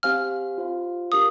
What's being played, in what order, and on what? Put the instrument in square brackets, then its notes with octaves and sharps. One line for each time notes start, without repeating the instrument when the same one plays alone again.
[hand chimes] C4 G4 C5 F5 G#5 [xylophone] F6
[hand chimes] F4 C5 F5
[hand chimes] D4 G4 A#4 F5 [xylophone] D#6